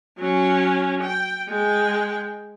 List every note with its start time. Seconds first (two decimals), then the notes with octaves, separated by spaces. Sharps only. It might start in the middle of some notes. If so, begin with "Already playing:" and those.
0.18 F#3 C#4
1.02 G5
1.49 G#3 G5